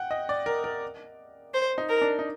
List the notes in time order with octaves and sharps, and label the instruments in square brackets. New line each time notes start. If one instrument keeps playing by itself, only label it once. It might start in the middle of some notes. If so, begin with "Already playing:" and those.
Already playing: [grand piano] F#5 G5
D#5
D5
A#4
A#4
[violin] C5
[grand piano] D#4
[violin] A#4
[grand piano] D4
D#4